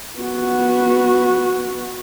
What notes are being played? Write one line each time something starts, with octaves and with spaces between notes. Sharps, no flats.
B3 F#4